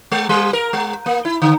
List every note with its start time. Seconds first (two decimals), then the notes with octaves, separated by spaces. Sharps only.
0.12 G#3
0.29 G3
0.53 A#4
0.73 G#3
1.06 A#3
1.25 E4
1.42 D3